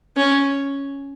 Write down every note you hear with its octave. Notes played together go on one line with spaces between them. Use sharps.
C#4